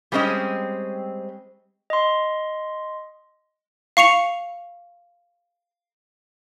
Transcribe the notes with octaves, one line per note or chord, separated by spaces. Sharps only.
G3 G#3 C4 C#4 D#5
D#5 C6
F5 C#6 C#7 F7